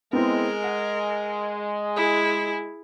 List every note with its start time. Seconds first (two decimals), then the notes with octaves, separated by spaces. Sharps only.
0.13 G#3 B3 C4 E4 A#4
0.64 F#5
1.96 E4 G#4